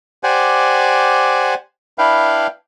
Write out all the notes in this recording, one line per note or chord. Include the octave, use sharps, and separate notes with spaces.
G4 C5 D5 F#5 G#5
D4 E4 B4 F5 G5